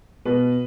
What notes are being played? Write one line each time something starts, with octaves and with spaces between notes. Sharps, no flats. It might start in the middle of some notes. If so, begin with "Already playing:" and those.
B2 B4